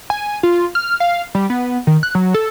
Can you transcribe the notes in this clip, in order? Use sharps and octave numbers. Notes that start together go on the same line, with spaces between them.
G#5
F4
F6
F5
G3
B3
D#3
F#6
F#3
A4